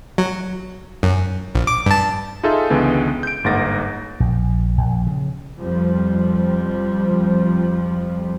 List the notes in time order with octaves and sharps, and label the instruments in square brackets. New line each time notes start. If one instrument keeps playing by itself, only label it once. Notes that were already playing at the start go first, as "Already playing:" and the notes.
[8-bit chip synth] F#3
F#2
A#1
D6
G2 A5
[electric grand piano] D#4 F4 G#4 A4 D#5 E5
C#2 D3 E3 G#3 B3
G6 D7
G1 G#2 A#3 F#5 A6 A#6
[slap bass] A#1
A#1
C#3
[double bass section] F2 F3 G3